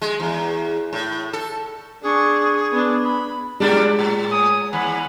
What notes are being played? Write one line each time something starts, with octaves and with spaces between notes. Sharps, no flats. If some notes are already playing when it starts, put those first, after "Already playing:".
G#3
E2
A2
A4
D4 G#4 C#6
B3 D4
B5
A2 G3 G#3 D4
A2
C#5 G#5 D#6
D#2 F#5 G#5 B5